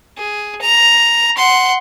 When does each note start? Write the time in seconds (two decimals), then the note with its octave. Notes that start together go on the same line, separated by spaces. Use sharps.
0.18 G#4
0.61 A#5
1.37 F#5 C6